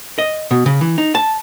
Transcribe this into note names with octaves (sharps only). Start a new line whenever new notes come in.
D#5
B2
C#3
E3
D#4
A5